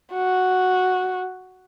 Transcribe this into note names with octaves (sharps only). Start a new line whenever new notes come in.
F#4